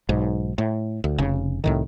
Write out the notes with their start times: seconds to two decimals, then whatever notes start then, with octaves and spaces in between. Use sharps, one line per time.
0.09 B1 G#2
0.58 A2
1.04 D2
1.18 F1 C#3
1.64 C2 A2 D#3